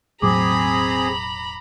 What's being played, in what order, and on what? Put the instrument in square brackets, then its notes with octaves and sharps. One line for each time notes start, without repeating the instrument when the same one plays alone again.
[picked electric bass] E1 A2 F#3 [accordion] C4 G#4 [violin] A#5 B5 [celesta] D6